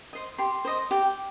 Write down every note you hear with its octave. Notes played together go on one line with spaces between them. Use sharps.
C5 D#5
G4 C6
C5 D#5
G4 G5